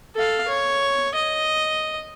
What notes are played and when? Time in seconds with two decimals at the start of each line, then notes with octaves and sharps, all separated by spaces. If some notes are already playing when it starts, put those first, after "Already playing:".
0.15 A4 F5
0.48 C#5
1.14 D#5